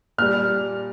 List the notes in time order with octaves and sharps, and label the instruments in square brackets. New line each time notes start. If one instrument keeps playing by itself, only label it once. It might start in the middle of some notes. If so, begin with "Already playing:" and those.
[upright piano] A#2 G3 F6